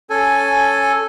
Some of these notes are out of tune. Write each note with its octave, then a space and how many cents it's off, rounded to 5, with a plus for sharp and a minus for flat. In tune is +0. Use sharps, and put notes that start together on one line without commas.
C#4 +5 A4 -5 G#5 +0